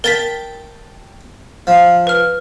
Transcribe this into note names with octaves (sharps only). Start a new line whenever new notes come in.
A#4 G5 A5 A6 B6
F3
B4 F6